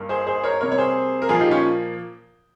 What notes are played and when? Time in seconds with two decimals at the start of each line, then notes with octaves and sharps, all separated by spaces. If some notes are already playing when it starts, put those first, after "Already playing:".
Already playing: G2 G3 A#3
0.09 G#4 C5
0.27 G#4 C5
0.43 A#4 C#5
0.61 C3 G3 A#3 A#4 C#5
0.72 C#5
0.78 G#4 C5
1.22 A#4
1.29 A#2 F3 A#3 F4 G#4
1.40 D#4 G4
1.51 C#4 F4